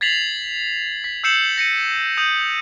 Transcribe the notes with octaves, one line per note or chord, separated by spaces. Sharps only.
G#6 A6 B6 C7 F7 F#7
B6
E6 G6 C7 C#7 E7 F#7
A#6 C#7 D#7
D#6 G6 D#7 F#7